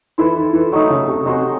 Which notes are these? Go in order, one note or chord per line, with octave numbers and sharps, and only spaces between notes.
E3 E4 A4 C5
D#3
E3
D#3 F#3 A3 D#4
C#3
C3
C3 C#4 F#4 C5 D#5